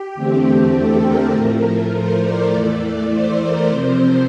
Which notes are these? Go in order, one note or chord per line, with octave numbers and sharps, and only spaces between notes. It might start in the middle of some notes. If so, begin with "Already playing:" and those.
Already playing: G4
E2 D3 A3 C4
A4
A#4
A2 F3 A3
C5
D5
E2 E3 A3
C5
A#4
C3 F3 C4 C5